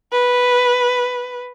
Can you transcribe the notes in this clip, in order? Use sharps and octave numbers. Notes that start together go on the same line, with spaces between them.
B4